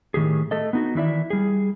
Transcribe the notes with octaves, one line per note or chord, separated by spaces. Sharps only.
A2 D#3 G4 G#4
A3 A4 D#5
B3 D#4 F#4
D#3 E3 E4 D5 E5
G3 G#4